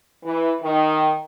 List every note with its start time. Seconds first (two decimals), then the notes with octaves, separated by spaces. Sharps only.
0.24 E3
0.62 D#3